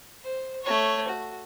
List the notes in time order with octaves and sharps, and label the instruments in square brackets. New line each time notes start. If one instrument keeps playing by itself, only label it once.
[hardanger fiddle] C5
A3 C#5
F#4